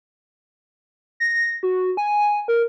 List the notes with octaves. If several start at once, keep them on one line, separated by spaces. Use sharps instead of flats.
A#6
F#4
G#5
A#4